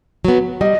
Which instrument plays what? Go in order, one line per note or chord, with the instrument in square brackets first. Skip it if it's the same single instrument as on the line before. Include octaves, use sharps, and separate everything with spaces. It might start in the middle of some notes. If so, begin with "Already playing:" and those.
[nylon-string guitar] F#3 B3
[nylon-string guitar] G3 [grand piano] D#5